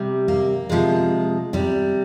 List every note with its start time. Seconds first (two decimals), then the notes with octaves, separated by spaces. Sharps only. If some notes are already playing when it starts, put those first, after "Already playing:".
Already playing: C3 G3
0.28 A#3
0.70 C3 F3 G#3
1.53 C3 G3